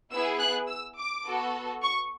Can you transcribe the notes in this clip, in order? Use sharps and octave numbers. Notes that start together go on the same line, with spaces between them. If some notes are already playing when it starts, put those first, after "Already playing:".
B3 E4 G#4 E6
F#6
E6
D6
B3 F#4 A4
C#6